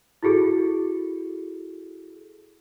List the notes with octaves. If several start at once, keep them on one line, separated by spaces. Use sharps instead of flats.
E4 F#4 G#4 A4